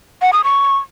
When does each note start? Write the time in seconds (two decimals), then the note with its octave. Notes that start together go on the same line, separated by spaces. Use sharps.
0.22 F#5
0.33 D#6
0.44 C#6